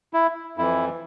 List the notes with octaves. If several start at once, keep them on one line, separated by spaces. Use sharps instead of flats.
E4
F2 E3 E4